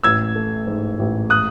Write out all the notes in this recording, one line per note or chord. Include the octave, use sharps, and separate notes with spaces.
A1 E6 G#6
A3
G#2
A1
D#6 F#6